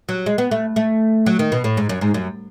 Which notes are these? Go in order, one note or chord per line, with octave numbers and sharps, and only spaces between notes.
F#3
G#3
B3
A3
A3
F#3
D#3
B2
A2
G#2
F#2
G#2
F#2